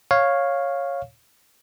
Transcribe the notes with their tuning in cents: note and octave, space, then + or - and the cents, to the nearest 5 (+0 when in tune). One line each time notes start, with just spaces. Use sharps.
C#5 -5 F5 +5